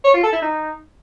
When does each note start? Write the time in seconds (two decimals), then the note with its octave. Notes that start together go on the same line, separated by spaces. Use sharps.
0.04 C#5
0.14 F4
0.23 A4
0.33 E4
0.42 D#4